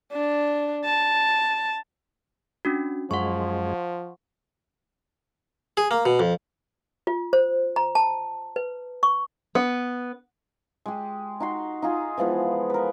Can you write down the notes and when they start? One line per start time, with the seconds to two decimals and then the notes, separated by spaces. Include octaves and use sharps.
0.12 D4
0.85 A5
2.65 C#4 D4 F#4
3.11 F#2 F3 G#3 F#5 C6 C#6
5.77 G#4
5.91 A#3
6.05 B2
6.19 F2
7.07 F4
7.33 C5
7.76 A#5
7.95 A5
8.56 B4
9.03 C#6
9.55 B3
10.86 G#3 G4
11.40 D#4 F#4 C6
11.82 D#4 F4 G#4
12.17 E3 F3 G#3 B3
12.70 A#4 B4